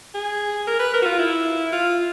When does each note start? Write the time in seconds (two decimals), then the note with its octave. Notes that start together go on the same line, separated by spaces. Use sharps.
0.14 G#4
0.67 A#4
0.80 B4
0.94 A#4
1.02 F#4
1.06 F4
1.19 E4
1.72 F4